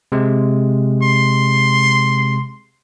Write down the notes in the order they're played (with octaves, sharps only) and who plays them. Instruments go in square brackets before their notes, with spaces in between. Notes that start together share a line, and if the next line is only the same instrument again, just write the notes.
[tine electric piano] C3 G#3
[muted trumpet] C6